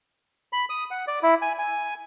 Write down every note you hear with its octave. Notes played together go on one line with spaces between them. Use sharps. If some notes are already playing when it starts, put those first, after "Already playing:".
B5
D#6
F#5
D5
E4
G#5
G#5